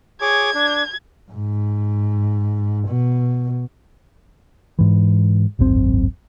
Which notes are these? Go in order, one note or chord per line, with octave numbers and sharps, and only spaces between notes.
G#4 C#5 D6 G#6
D4
G#2
B2
G#2 E3
D1 G#1 F#2 C4